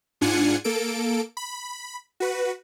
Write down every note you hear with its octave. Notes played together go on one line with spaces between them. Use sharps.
G#2 D4 F4 F#5 G#5 C#7
A#3 A4 D7
B5
F#4 B4